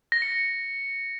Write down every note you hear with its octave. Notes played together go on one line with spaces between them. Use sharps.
A#6
C#7
A#6